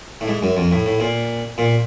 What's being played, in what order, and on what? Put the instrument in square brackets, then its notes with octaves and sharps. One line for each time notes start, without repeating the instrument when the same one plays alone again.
[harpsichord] A2
G#2
F#2
F2
A2
A2
A#2
A#2